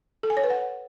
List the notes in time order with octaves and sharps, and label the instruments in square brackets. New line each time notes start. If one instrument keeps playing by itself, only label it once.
[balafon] A4
G#5
C#5
B4
F#5